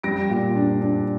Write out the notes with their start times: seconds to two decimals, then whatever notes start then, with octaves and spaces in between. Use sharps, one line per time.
0.03 G3 A#6 D7
0.30 A#2
0.56 D4
0.81 D4